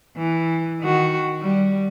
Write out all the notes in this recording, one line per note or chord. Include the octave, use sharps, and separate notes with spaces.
E3
D#3 F#4
G3